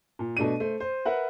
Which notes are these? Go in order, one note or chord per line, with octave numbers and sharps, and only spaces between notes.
A#2
B2 A3 D4 D#7
A3 C5
C5
A#4 B4 E5 F#5